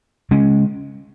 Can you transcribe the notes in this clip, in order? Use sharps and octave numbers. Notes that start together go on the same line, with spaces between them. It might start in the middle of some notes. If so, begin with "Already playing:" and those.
C#3 G#3 C#4